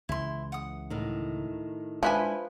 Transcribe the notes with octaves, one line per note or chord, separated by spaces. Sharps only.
C#2 C#3 E3 E4 C6
F#5 D#6
A2 D#3
F3 G#3 D4 E4 B4 E5 G#5 C6